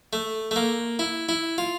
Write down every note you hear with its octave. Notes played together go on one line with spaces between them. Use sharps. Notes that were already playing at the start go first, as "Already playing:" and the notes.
A3
A3
A#3
E4
E4
F4